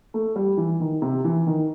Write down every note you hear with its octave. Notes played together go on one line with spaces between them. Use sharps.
A3
G3
E3
D#3
C3
E3
D#3